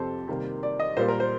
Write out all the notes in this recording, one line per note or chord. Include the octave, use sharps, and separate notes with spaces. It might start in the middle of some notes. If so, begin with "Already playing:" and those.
Already playing: F2 C3 F3 C4 G4 A4 C5
C3 D#3 G3 A#3
D5
D#5
A#2 G3 A#3 C5
A#4
C5